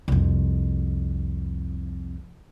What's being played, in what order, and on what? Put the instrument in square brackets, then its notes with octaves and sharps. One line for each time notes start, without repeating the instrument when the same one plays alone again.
[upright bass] C2 F2